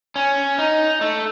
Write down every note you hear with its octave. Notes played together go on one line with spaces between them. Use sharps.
C#4
D#4
A3